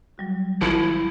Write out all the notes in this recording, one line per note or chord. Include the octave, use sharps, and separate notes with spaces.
F#3 G3 F#4
G#1 F3 E4 C#7